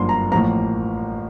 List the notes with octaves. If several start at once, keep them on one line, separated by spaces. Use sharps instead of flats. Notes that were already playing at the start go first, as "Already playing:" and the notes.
Already playing: G1 F#2 D3 F3 A#3 C6
A#5
A1 A2 F3 A#3 A#5